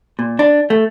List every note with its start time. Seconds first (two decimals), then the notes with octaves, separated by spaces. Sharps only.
0.19 A#2
0.39 D4
0.70 A3